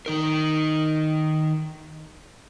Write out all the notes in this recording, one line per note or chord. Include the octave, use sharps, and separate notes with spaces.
D#3 D#4 A#4